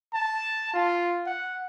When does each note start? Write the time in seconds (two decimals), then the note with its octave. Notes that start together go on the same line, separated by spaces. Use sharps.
0.13 A5
0.73 F4
1.26 F#5